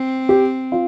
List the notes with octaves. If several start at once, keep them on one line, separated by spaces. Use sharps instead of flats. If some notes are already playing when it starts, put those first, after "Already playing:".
Already playing: C4
G4
F4